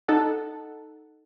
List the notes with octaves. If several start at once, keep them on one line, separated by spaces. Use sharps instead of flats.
D#4 A4 F#5